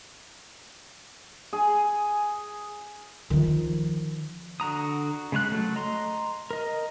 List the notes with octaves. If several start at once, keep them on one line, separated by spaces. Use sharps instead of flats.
G#4
D#3 F3
D3 F#4 A#5 D#6
C#3 G#3 C#5 F#6
F#3 A3
D#5 A#5 C6
A#4 D#5